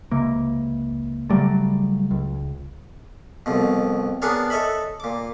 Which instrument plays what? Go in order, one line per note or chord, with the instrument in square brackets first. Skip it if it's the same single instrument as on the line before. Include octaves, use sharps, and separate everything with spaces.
[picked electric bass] C#2 C3 A#3
C#3 F#3 G3 A3
C#2
[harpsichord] C2 F2 B2
B3 D4 G#4 A#4 C#5
A4 C#5 D#5 E5 B5
A#2 D6